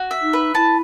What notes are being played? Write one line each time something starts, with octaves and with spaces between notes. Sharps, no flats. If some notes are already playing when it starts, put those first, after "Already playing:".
Already playing: F#4
E5
D#4
B4
E4 A5